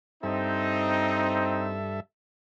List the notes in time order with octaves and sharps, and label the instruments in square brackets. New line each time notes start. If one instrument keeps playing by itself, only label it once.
[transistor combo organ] G2 A4 E5 [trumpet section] C4 D#4